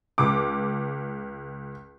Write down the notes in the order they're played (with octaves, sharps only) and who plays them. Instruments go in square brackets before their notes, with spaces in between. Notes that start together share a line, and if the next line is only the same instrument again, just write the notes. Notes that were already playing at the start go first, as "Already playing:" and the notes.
[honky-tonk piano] C#2 D6